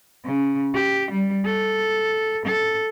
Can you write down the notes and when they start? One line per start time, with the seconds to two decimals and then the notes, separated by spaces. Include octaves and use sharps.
0.25 C#3
0.74 G4
1.12 G3
1.45 A4
2.46 A4